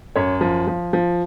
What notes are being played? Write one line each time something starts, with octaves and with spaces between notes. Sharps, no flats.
F#2 C#5
F3
F3
F3